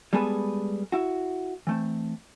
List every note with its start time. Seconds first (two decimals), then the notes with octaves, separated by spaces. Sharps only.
0.13 G3 G#3 B3 G#4 A4 B4
0.92 E4 F#4
1.67 E3 A3 C4